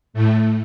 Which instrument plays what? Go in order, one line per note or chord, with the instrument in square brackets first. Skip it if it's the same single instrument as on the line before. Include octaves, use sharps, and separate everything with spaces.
[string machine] A2 A3